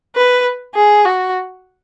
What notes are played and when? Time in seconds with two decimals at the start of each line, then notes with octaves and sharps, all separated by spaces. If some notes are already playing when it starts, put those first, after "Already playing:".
0.16 B4
0.75 G#4
1.05 F#4